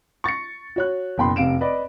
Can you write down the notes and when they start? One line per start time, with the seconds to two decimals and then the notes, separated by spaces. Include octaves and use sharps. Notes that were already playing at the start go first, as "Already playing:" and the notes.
0.24 C#6 A6 A#6 C#7
0.76 F#4 C#5 F#6
1.18 F#1 B2 G5 B5 C6
1.36 F1 C3 F5 D7 E7
1.61 B4 D5 D#5